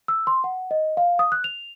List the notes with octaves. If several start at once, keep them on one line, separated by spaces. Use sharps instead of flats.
E6
C6
F#5
D#5
F5
D#6
F#6
F7